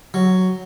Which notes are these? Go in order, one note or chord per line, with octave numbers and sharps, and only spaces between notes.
F#3